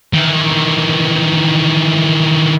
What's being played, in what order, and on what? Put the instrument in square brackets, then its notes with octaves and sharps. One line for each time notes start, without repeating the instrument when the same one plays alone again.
[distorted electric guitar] D#3 E3